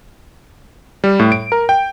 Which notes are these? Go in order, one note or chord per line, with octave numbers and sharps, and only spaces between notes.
G3
A2
D7
A#4
G5